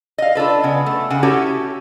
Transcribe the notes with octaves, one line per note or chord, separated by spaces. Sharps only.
D#5 F5
D4 F4 A4 B4
C#3 B3
A3
C#3 F#5
C#4 E4 F#4 G4 A4